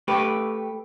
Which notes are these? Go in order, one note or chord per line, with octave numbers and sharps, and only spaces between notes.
A3 G4 B4